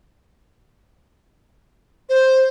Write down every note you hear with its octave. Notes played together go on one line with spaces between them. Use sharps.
C5